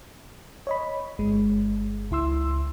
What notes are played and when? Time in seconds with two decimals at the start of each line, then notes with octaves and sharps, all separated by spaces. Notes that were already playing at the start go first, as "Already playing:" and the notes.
0.67 C#5 D#5 B5
1.18 G1 G#3
2.11 C#2 E4 C6 E6